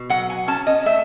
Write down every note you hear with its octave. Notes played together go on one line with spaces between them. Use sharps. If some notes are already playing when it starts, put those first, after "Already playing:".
Already playing: B2
F#3 F#5
G#5
C#4 A5
D#5
A3 E5